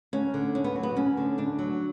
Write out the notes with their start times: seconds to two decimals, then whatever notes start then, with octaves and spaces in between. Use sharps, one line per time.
0.13 D2 C#4
0.34 D3
0.55 D2 C#4
0.64 B3
0.76 F#3
0.83 B3
0.96 D2 C#4
1.17 D3
1.38 D2 D4
1.59 F#3